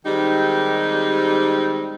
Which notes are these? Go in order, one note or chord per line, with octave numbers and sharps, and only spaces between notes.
D#3 G3 G#3 C4 D#4 G4